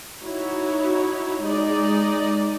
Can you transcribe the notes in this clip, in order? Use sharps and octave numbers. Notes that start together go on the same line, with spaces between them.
D#4 E4 F#4 C#5
G#3 D#4 D5 D#5